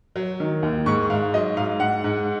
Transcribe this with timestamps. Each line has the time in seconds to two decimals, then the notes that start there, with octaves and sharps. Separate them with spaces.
0.16 F#3
0.40 D#3
0.63 D#2
0.86 G#2 C#6
1.10 G#2 F5
1.34 F#3 D#5
1.56 G#2 F5
1.80 G#2 F#5
2.04 G#2